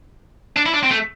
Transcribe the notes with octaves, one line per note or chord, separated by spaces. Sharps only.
D4
E4
D4
C4
A3